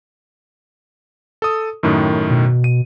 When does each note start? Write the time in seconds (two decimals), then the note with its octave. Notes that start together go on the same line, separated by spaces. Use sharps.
1.42 A4 D#6
1.83 F#2 A2 D#3
2.30 B2
2.64 D#7